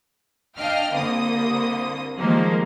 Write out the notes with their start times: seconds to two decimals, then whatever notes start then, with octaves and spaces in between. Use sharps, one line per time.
0.56 D4 D#5 F5 G5 F6
0.93 C2 D3 A#3 C5 D#6
2.17 D#3 F3 G3 G#3 A#3 C5